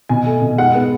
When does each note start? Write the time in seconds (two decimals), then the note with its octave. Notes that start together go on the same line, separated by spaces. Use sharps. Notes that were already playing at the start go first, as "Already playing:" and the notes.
0.09 B2 G#5
0.26 A3
0.42 B2
0.58 G#3 F#5
0.75 B3